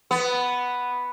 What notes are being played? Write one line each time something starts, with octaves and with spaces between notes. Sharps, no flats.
B3